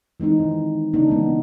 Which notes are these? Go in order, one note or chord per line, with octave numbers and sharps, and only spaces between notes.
E3 G#3 C4 D#4
D#3
C#3 A#3 D4 D#4
E3 G#3 B3